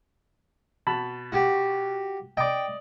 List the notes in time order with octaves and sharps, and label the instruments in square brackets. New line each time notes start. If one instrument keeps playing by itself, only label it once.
[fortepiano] B2 A5 B5
[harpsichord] F#4 G4
[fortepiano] D5 D#5 [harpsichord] G5